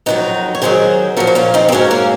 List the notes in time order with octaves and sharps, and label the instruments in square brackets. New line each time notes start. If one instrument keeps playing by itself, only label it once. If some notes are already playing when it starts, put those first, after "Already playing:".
[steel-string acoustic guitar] F2 C3 D#3 F#3 D#4 F#4
C#5
G#2 D#3 F#3 G#4 C5
A#2 F3 F#4 A#4
F#4
C#4 F4
C4 D#4
C4
G#2 F#3 A#3 C#4
A#3 C#4